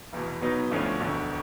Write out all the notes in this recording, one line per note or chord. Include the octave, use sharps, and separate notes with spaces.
F1 E2 B2
B2 F#3 B3 D#4
D2 D3 F3 A3 C#4
E1 D2 D3